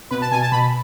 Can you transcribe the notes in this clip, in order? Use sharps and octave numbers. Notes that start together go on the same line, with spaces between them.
B2 B4
A5
B2 G#5
A5
B2 B5